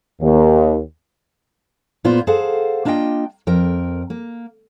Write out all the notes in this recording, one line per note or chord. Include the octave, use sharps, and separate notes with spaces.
D#2
A#2 B3 F4 C5
G#4 A4 C5 F5 F#5
A#3 D4 F4 D#5 G5
F2 A#4 G5
A#3